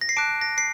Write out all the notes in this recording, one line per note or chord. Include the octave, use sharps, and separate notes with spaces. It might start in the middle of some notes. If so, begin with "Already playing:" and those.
A#6
C7
A5 D6 F#6 D7
A#6
C7